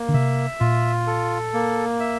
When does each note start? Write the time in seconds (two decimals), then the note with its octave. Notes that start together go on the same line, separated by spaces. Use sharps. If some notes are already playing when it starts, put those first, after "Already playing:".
Already playing: A#3
0.09 D3
0.14 C3 E5
0.60 A#2 F4
1.07 A4
1.54 A#3
2.00 E5